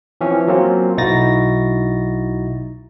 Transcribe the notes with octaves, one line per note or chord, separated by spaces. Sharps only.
E3 F3 C4 C#4
F#3 A#3 C4 C#4 F4
B1 D#4 E4 F#4 A6 A#6